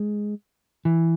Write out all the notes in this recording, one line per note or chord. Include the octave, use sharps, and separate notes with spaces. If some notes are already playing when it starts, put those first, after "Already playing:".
Already playing: G#3
E3